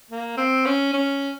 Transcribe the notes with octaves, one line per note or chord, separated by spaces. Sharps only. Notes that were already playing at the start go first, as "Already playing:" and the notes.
A#3
C4
C#4
C#4